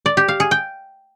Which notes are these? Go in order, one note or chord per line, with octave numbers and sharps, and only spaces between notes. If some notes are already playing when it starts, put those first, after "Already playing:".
D5
G4
F5
G#4
G5